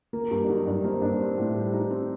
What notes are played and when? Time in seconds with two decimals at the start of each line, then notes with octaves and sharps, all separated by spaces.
0.13 A#3 A#4
0.31 G2 G4
0.44 D4
0.48 F#3 D#4
0.66 G2 D4
0.84 A#3 C4
1.02 G2 D4
1.20 C4
1.38 A2
1.55 G3
1.73 D#4
1.91 C4